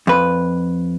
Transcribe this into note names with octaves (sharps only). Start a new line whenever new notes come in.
F2 B4